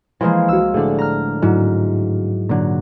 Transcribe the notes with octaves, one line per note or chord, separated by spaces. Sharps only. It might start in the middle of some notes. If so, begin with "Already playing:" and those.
E3 F3 G#3 A#3
C2 F#4 E6
A2 D3 G#4 A4 D5
A#5 F6
G#2 F#3 E4 F#4
A#2 D3 F#3